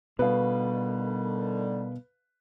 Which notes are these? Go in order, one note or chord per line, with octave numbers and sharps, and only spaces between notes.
B2 D3 D#3 G3 B4 F5